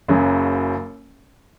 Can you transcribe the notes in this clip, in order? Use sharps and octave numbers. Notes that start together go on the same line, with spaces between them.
F#1 F#2 C#3 F#3